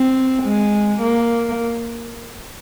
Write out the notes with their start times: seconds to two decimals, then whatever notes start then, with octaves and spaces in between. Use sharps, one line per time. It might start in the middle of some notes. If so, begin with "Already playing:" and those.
Already playing: C4
0.42 G#3
1.01 A#3